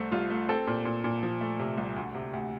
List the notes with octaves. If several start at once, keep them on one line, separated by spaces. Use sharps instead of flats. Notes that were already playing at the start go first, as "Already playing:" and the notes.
Already playing: C2 A3 C5
C2 F4
A3
C4 A4
A#2
A#2
A#2
F3
A3
C3
C2
D2
C3
D2